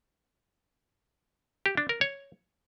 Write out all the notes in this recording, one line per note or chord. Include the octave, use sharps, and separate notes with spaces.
G4
D4
A#4
C#5